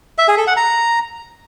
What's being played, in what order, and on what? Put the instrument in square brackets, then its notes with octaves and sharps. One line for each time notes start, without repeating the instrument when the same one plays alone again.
[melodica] E5
G#4
A4
F#5
A#5